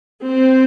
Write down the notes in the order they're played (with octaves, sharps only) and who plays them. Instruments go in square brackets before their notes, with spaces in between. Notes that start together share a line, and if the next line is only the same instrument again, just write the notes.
[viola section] C4